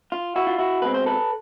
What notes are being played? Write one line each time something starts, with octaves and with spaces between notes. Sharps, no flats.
F4
E4 F#4
F4
E4 F#4
C#2 B2 G#3 C4 B4
C5
A4 B4